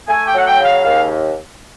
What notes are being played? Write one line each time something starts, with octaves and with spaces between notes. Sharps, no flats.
A3 G#5
G5
F#3
F#5
G5
C#3
F5
D#2 F5